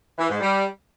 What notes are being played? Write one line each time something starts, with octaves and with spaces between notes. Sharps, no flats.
E3
G#2
G3